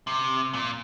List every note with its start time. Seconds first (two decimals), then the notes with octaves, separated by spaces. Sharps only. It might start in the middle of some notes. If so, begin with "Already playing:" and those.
0.07 C3
0.54 A#2